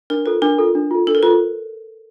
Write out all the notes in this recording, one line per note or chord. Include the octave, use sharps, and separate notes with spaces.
D4 A#4
F4 A4 B4
D4 A#4
F4 A4
D4
F4 A4
D4 A4
A#4
F4 A4 B4